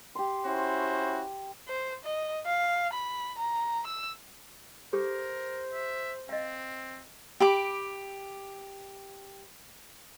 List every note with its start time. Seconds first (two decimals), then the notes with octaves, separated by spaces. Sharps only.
0.15 G4 C6
0.45 C#4 E4 F#4 C5
1.68 C5
2.05 D#5
2.46 F5
2.93 B5
3.39 A#5
3.87 E6
4.93 G4 A4 A#4 C5
5.73 E5
6.29 C4 D#5 F5
7.40 G4 B5 D6